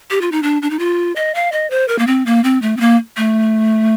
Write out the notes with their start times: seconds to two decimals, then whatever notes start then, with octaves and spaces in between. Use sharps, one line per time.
0.11 G4
0.21 F4
0.32 D#4
0.43 D4
0.62 D4
0.70 D#4
0.79 F4
1.16 D#5
1.35 F5
1.52 D#5
1.70 C5
1.88 A#4
1.99 A#3
2.07 C4
2.26 A#3
2.44 C4
2.62 A3
2.77 C4
2.80 A#3
3.17 A3